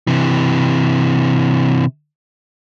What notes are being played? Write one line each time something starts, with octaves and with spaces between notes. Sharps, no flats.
C3 E3